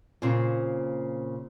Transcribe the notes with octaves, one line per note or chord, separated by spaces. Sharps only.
A#2 C#3 C4